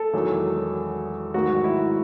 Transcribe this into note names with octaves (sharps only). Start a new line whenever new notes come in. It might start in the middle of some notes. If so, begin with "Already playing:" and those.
Already playing: A4
E1 E2 D#3 F#3
A1 G#2 D#3 F#3 F#4
E4